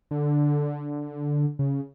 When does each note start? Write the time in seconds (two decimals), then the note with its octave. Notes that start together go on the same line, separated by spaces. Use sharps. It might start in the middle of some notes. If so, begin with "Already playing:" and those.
0.11 D3
1.59 C#3